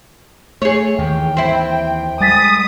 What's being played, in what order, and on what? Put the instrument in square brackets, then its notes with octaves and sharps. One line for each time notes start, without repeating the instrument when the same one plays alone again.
[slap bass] A3 [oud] G#4 C#5
[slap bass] D#2 D#3 E3 [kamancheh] G5
[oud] C4 E4
[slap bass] G3 G#3 [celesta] G#5 A6 B6 [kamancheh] D#6